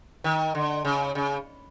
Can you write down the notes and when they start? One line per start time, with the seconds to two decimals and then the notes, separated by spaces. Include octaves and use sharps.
0.24 D#3
0.55 D3
0.85 C#3
1.15 C#3